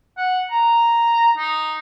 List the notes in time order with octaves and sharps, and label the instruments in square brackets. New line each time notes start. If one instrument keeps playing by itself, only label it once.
[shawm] F#5
A#5
D#4